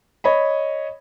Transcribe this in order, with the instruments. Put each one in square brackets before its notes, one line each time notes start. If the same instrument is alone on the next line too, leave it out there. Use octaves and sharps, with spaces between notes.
[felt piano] C#5 D#5 B5